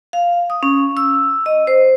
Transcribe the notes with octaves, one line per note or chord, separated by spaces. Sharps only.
F5
D#6
C#4
E6
D#5
C5